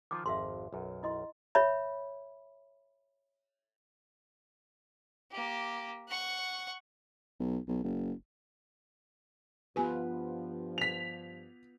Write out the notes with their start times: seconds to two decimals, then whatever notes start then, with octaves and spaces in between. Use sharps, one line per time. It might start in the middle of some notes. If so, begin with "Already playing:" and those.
0.11 D#3 F3 F4 D6
0.26 G#1 F2 E5 F5 C6
0.73 B1 F#2
1.03 E4 D#5 C6
1.55 C#5 E5 B5
5.32 A#3 G4
6.08 F#5 C#6
7.40 B1
7.68 B1
7.84 F#1
9.76 G2 F3 B3 F4 G4 B4 G#5
10.78 B6 F7